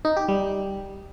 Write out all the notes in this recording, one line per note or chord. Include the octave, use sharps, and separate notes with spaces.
D#4
G4
G3